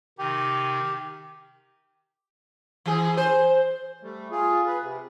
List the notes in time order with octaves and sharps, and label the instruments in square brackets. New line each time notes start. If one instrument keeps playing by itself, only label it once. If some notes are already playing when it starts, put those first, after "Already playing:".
[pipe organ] C3 D#3 D#4 [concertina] G4
[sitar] E3 G#4
C5
[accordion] G3 A3
F4 G#4
G#4 B4
C3